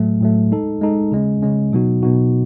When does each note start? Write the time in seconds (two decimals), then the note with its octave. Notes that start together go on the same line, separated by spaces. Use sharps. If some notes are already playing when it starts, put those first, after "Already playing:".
Already playing: A2 F#3 A3
0.21 A2 F#3 A3
0.51 G#3 D#4 A4
0.82 G#3 D#4 A4
1.12 C#3 G#3 C#4
1.42 C#3 G#3 C#4
1.72 B2 F#3 B3 D#4 F#4
2.03 B2 F#3 B3 D#4 F#4